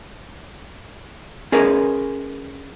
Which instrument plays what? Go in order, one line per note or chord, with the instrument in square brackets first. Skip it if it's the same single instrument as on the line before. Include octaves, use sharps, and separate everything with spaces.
[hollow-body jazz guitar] C#4 G#4 A#4 B4